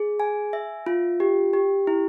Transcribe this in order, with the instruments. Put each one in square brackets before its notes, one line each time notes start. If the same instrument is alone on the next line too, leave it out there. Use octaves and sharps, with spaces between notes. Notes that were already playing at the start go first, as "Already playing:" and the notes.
Already playing: [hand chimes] G#4
G#5
E5
F4
G4
G4
E4